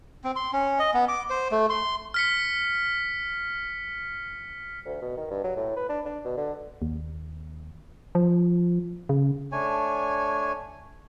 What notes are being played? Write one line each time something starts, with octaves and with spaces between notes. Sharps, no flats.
C4
C6
C#4
D#5
B3
D6
C5
A3
C6
F6 B6 C#7
D2
B2
D#3
G2
F#3
A2
B4
D4
D4
B2
D3
D#2
F3
C#3
A3 D4 C#5 G#5